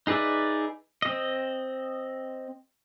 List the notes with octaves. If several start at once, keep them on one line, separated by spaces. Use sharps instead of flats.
D#4 G#4 B4 D5 E5
C4 D#5